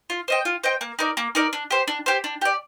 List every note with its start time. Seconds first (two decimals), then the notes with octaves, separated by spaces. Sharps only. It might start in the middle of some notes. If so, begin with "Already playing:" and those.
0.10 F4
0.28 C5 D#5 G5
0.45 F4
0.64 C5 D#5 G5
0.81 A#3
0.99 D#4 A#4 D5
1.17 A#3
1.35 D#4 A#4 D5
1.53 D4
1.71 G4 C5
1.88 D4
2.06 G4 C5
2.24 D4
2.41 G4 D5